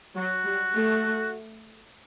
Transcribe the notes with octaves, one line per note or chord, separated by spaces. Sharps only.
F#3 F#4
G3
A3